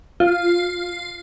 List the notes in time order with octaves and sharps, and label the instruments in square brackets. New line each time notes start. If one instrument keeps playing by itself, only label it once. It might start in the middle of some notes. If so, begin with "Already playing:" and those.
[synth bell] F4